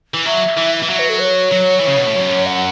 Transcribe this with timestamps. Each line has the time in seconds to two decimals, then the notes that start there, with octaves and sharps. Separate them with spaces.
0.14 E3
0.26 F#3 E5
0.57 E3
0.82 E3
0.89 F#3 E5
0.99 B4
1.09 A4
1.20 C#5
1.51 F#3
1.79 E3
1.87 C#3
1.96 B2
2.06 A2
2.16 F#2
2.46 F#5